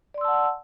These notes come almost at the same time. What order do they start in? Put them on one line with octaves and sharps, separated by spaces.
D5 C6 E6 A5 F#5